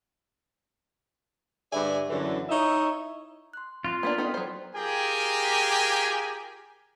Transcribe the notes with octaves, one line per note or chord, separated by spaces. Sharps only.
G2 D3 B4 D5 E5 G#5
F#2 D3 E3
D#4 E4 C#5 D#5 E5
C6 F#6
C4 F4 F#6
A#3 B3 D4 C6 B6
B3 D#4 A4 D5 G5
F#3 C5
F4 G4 G#4 A#4 G5 G#5